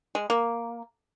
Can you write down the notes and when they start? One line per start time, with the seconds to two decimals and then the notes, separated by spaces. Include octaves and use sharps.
0.15 G#3
0.30 A#3